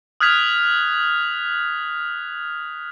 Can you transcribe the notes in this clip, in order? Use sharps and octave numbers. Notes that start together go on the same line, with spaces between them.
D#6 F6 F#6 G#6 B6 F7